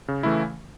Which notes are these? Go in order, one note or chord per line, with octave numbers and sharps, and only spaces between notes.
C#3
E3 A3 E4